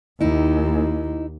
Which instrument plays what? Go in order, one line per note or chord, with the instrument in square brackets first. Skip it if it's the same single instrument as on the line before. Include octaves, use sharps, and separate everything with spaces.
[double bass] D#2 [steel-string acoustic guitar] D#4 E4